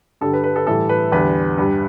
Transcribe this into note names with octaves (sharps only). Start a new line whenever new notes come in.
G2 D3 G3 A4
B4
B4
A4
A2 E3 G3 A4
B4
E2 D3 G3 B4
G2 G3